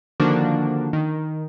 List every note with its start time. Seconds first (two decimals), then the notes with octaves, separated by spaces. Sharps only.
0.20 D3 D#3 F3 A#3 D4 F#4
0.93 D#3